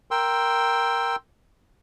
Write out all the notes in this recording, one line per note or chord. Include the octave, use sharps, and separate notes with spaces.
A#4 G5 C6 E6